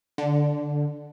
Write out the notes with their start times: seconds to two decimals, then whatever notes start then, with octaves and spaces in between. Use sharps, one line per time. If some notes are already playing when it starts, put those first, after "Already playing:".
0.18 D3